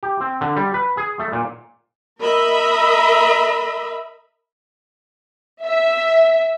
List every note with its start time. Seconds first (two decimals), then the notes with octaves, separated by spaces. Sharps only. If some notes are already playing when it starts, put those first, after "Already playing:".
0.03 G4
0.20 C4
0.41 D3
0.57 G3
0.74 B4
0.97 G#4
1.19 A3
1.33 A#2
2.20 A#4 D#5 E5 B5
5.64 E5